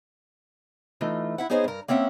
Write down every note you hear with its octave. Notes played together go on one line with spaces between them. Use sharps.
E3 A3 D#4 F4
E4 E5 F#5
B3 D#4 G#4 C5 C#5 D#5
G2 A#4
A#3 C4 C#4 E5 F#5